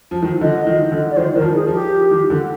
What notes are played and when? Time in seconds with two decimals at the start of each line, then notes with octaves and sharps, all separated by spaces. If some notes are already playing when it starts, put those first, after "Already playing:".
0.11 F3
0.23 D#3
0.41 D3 D#5
0.67 D#3
0.92 D3
1.11 D5
1.17 D#3 C5
1.36 D#3 A#4
1.42 F3
1.54 G#4
1.67 F3
1.73 G4
2.11 D#3
2.30 D3